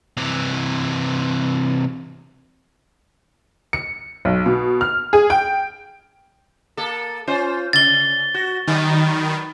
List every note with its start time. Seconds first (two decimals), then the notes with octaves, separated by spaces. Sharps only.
0.17 C3 E3
3.73 C#7
4.25 B1
4.46 B2
4.81 F6
5.13 G#4
5.30 G5
6.77 A#3 A4
7.27 C#4 F4 C5
7.73 C#3 A6 G7
8.34 F#4
8.67 D#3 F#3 B3 B4